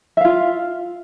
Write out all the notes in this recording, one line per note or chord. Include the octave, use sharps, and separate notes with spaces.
F4 E5 F5